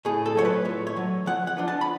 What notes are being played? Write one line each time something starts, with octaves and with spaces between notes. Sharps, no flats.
A2 G#4
A4
F#3 A3 F4 C#5
B4
A2 C#5
C#5
F#3 A3 F4
F3 F#5
F#5
B3 D4 F4
A5
B5